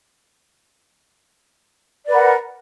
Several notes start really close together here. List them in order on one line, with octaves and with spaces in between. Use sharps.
D5 B4 A#4 F#5